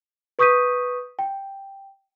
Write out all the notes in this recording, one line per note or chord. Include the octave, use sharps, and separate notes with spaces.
B4 C#6 D#6 G6 B6 D#7
G5